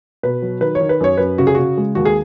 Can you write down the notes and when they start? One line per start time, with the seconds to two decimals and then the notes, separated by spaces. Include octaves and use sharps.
0.23 B2 B4
0.42 F#3
0.61 D#3 B4
0.75 C#5
0.81 D#3
0.89 B4
1.01 F#2 C#5
1.17 F#2 B4
1.38 C#3 F#4
1.47 G#4
1.55 C#3 F#4
1.78 G#3
1.95 D#2 F#4
2.05 G#4